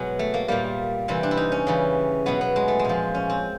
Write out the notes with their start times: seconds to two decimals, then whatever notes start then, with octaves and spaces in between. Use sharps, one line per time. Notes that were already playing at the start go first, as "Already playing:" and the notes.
Already playing: B2 F#3 G#3
0.19 A3
0.34 A#3
0.48 A#2 G3 A#3
1.08 C3 E3 G3 C4
1.23 D4
1.31 E4
1.37 D#4
1.52 C#4
1.67 C#3 E3 G3
2.26 B2 F#3 B3
2.41 B3
2.56 G#3
2.68 A3
2.79 G#3
2.85 A#2 F3
3.14 C#4
3.30 C4